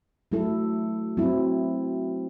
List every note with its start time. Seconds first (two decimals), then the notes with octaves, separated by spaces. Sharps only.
0.32 F#3 A3 E4 A4
1.17 F#3 C4 E4